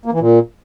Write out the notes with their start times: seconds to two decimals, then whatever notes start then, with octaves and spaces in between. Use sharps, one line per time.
0.05 A#3
0.13 E3
0.20 A#2